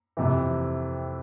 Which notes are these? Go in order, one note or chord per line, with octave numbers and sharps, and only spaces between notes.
F2 C3 E3